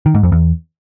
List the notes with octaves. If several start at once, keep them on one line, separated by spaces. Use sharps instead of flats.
D#3
G#2
F2
E2